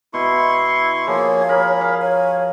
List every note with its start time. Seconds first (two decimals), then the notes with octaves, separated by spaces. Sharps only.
0.14 B2 E4 C6 C#6
1.07 F3 A#3 G#4 C#5
1.49 G#4 A#4 B5
1.81 F5
2.01 C#5 G#5